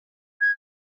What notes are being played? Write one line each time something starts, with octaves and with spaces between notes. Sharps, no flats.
G#6